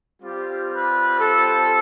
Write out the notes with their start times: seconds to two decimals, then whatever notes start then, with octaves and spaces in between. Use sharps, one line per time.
0.22 G3 C4 F4 G4
0.71 B4
1.18 A4